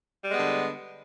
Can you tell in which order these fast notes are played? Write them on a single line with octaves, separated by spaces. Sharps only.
G3 G#3 B3 D3